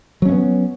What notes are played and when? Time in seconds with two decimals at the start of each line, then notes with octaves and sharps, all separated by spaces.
0.22 F#3
0.25 C#4
0.29 A3
0.32 B3